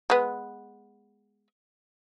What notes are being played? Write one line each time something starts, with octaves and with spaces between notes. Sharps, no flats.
G#3 B3